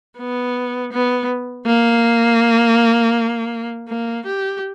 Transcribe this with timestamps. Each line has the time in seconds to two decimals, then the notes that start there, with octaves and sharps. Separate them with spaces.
0.18 B3
0.92 B3
1.66 A#3
3.88 A#3
4.25 G4